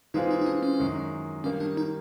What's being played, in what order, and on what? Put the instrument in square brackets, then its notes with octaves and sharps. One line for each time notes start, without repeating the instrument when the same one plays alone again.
[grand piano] E3 G#3 C4 F4 G#4 [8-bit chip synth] D#4
[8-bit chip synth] D#4
D#4
D4
C#4
[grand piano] F#2 D#3 G#3
[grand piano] D#3 G3 A#3 D#4 [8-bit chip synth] C#4
[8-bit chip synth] D4
D#4